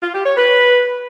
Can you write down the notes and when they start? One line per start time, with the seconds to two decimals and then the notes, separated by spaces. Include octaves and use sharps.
0.03 F4
0.14 G4
0.26 C#5
0.37 B4